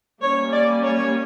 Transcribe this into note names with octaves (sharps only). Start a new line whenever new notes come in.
G3 A#3 C#4 C#5
D5
C#5